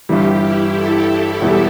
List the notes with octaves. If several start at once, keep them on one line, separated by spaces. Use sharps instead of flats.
G1 G2 E3 G3 G4
E4
A4
E1 E2 E3 G3